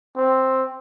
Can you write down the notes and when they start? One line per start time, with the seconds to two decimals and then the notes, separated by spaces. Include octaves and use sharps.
0.17 C4